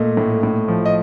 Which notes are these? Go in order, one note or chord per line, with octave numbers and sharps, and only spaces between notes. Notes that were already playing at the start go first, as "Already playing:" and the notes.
Already playing: A#2 A3 D#5
A2
A2
F3
D#5